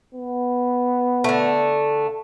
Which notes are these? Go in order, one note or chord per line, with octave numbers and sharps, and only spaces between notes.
B3
D3 A3